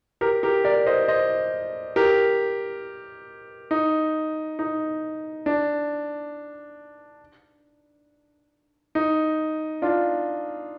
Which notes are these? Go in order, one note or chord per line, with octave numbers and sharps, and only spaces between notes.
G4 A#4
G4 A#4
A#4 D5
C5 D#5
C5 D#5
G4 A#4
D#4
D#4
D4
D#4
D4 F4